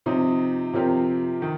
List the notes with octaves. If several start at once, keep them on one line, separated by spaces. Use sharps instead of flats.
C3 F3 C4 D#4
C3 F3 C4 G4 A#4
D#3